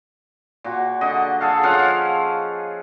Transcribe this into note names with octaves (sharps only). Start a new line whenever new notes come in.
A#2 F#4
D3 D#5
G#4 A4 F5
F3 C#4 F5 F#5